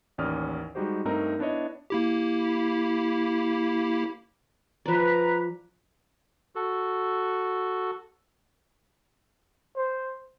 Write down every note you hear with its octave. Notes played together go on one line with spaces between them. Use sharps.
A1 D#2 C#4 D5 D#6 F6
G3 G#3 D#4 F#4 G4 C5
G2 A3 C4 D#4 A#4 A#5
B3 D4 E4 C#5 D#5
A#3 E4 G4
F3 B4 D5 A#5
F#4 A4
C5